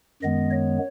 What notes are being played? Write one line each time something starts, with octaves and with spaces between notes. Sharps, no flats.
F#2 D#3 G#3 B3 D#5
C#5